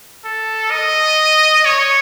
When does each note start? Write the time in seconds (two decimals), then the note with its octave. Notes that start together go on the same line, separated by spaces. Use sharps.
0.24 A4
0.71 D#5
1.65 C#5